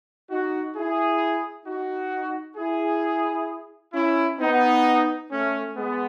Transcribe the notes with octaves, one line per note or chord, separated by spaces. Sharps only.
D#4 F#4
E4 G#4
D#4 F#4
E4 G#4
C#4 E4
B3 D#4
A3 C#4
G#3 B3